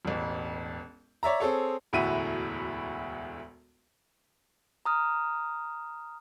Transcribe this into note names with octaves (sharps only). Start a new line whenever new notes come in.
E1 A1
C#5 D5 E5 A#5
C4 G#4 A4 C#5
E1 D2 A2 F#4 E5 D#7
A#5 D#6 F6